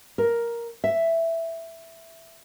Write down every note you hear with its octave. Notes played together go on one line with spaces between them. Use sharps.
A#4
E5